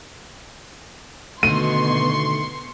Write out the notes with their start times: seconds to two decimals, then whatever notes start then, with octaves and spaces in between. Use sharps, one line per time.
1.43 B2 D3 D#3 A3 C6 C#6 D#7